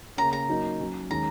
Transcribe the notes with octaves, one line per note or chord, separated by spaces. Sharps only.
C#3 A#3 C#4 A#5
A#5
F#3 A#3 D#4
F#3 C#4
D#3 G#3 C#4 A#5